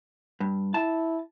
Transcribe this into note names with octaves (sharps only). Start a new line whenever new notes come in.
G2
E4 A5